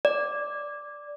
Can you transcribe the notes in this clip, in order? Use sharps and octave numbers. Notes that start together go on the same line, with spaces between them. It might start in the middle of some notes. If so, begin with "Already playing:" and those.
D5